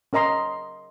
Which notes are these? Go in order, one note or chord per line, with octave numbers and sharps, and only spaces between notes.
C#4 A#4 D#5 A#5 C6